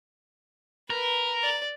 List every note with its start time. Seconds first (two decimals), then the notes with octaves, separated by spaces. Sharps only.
0.90 A#4 B4
1.42 D5